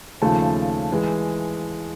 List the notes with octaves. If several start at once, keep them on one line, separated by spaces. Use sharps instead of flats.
D#2 C#3 F3 A3 A5
E3 G#3